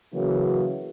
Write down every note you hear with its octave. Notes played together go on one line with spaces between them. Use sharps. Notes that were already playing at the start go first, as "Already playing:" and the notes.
C#3 E3 F#3 A#3